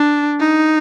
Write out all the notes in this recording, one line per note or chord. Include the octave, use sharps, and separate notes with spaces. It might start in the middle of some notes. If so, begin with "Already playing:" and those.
Already playing: D4
D#4